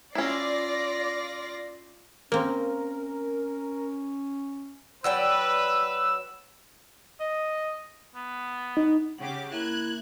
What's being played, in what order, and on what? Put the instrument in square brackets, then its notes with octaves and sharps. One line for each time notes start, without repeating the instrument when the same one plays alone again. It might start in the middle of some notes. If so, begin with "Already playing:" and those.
[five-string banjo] C#4 E4 [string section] F4 A#6 C7 [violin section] D5
[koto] A#3 C4 [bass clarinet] C#4 [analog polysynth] A#4
[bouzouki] F#3 D5 G5 [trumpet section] B4 [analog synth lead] E6
[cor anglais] D#5
B3
[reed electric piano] D#4
[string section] C#3 G4 D6 [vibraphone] F#5
[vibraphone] A#3 A#4 E5 [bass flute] E4 [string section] F#6 G#6